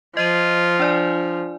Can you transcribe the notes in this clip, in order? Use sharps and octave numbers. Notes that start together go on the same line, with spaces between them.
F3 F4 D#5 D#7
D4 D5 G#5